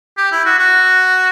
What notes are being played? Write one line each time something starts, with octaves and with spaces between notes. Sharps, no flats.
G4
E4
F#4
F#4